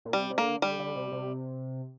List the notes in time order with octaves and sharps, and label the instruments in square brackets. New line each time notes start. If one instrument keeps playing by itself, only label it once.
[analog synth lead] A#2
[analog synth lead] C3 [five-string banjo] G3
[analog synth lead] C3
[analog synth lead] D3 [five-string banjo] A#3
[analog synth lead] D3 [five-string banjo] G3
[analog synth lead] D3
C3
C3